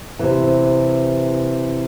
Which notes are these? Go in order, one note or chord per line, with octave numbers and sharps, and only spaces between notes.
C3 E3